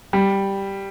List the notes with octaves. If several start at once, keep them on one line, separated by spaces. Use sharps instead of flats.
G3